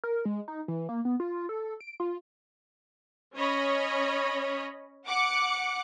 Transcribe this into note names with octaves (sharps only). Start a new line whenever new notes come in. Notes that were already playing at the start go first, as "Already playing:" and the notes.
A#4
G#3
D#4
E3
A#3
B3
F4
A4
D7
F4
C#4 C#5 D#5 B5
F#5 D6 F#6 C#7